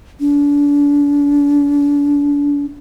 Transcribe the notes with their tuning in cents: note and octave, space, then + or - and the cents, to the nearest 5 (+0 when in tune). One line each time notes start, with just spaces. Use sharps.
D4 -35